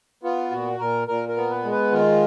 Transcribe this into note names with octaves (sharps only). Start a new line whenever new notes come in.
B3 F4
A#2 F#4
A#2 A#4
A#2 A#4
A#4
B3
B4
G#3
B4
D#3 F4